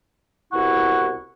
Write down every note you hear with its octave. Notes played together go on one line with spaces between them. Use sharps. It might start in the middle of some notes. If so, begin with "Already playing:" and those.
C2 B2 E4 F#5 C#6